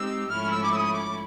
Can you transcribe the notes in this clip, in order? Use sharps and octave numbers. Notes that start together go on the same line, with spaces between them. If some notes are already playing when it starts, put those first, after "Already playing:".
Already playing: G#3 C4 D#4 G4 E6
G#2 F3 A3 C#4 E4 F6
E6
D6
E6
D#6
D6